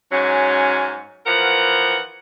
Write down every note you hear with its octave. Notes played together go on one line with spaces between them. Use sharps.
G#2 F#3 C#4
E3 F3 A#4 F#5